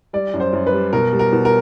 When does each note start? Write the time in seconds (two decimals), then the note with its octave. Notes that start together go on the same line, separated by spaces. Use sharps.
0.13 G3 D5
0.34 F#2
0.40 C5
0.53 F#2
0.67 B4
0.73 G3
0.93 B2 A#4
1.13 G3
1.19 A#4
1.32 B2
1.45 A#4